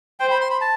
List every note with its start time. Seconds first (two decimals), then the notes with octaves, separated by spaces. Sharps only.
0.20 C5 G5
0.31 B5
0.41 C6
0.50 B5
0.61 A5